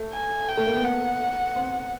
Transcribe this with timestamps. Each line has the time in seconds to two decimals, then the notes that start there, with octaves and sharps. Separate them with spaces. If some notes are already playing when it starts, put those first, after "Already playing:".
Already playing: A3
0.13 G#5
0.49 G5
0.57 A3
0.67 A#3
0.75 B3
0.84 F#5
1.56 C4